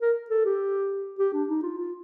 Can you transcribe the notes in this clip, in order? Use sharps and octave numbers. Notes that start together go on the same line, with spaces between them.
A#4
A4
G4
G4
D4
D#4
F4
F4